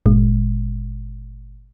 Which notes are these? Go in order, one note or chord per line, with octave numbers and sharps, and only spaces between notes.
G1 A#2 G#3